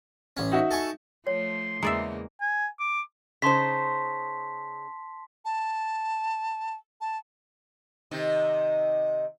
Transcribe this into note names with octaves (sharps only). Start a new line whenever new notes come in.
A1 C#4
D#4 F#4 E5
A4 G#5 C#6
F3 A3 C#5 C6
E2 C#3 G#3 A#3 D5 E5 A#5
G#5
D6
C#3 D#4 C5 A5 C6 B6
A5
A5
C3 D#3 D#4